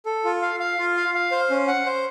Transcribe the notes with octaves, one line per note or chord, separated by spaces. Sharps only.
A4
F4
F5
F5
F4
F5
F5
C5
C#4
F#5
C5